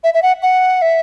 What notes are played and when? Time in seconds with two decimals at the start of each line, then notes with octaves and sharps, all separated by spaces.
0.04 E5
0.14 E5
0.23 F#5
0.43 F#5
0.82 E5